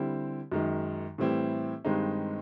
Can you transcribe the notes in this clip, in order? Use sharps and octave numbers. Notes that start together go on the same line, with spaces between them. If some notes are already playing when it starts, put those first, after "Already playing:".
Already playing: D3 G3 C4 E4
F#2 D#3 G#3
A2 E3 G3 C4 E4
G2 D#3 G#3 C4 D#4